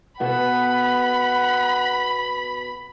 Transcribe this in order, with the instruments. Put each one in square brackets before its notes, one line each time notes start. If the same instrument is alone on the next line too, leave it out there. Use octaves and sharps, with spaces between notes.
[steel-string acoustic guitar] B2 B3 A4 [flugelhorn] F#5 [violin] B5